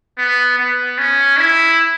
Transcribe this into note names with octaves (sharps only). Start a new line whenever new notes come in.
B3
B3
C#4
E4